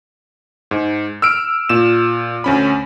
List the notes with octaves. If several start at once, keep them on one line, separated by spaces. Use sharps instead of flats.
G#2
E6 F6 D7
A#2 E7
D2 C#4 B5